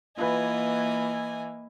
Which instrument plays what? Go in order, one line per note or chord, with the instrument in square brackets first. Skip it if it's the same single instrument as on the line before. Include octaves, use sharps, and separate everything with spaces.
[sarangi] E3 [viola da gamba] A#3 [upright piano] F4 B4 [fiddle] D#5 G#5